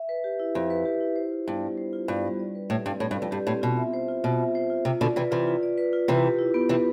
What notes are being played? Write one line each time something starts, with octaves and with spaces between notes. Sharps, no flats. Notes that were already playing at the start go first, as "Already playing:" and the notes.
Already playing: E5
B4
G4
E4
F2 E5
B4
G4
E4
C5
F4
G2 B3
G3
C5
F4
G2 B3
G3
D5
B4
A2 G4
G2 C4
A2 D5
G2
B4
F2
G2 G4
A2 C4
B2 F4
E5
C5
F4
B2 F4
E5
C5
F4
C3 F4
B2 D3 D5
C3 E3 B4
C3 E3 F4
F4
D5
B4
F4
C3 E3 B4
G4
E4
B3
C3 E3 B4